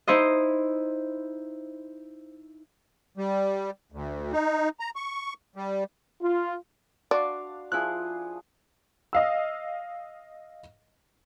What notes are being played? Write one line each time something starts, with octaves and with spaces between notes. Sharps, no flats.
D#4 E4 C5 D#5
G3
D2
D#4
A#5
C#6
G3
F4
D4 F#4 D5 F5 C6 D6
F3 E4 G#4 C6 F#6
D#5 F5 E6